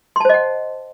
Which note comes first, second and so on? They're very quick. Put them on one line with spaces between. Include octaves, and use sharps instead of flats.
C6 A5 C5 D#5 F#5